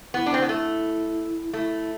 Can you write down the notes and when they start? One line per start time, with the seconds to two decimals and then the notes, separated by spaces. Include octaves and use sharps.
0.14 B3 E4
0.26 D4
0.34 C4
0.42 B3
0.49 A3
1.53 A3 E4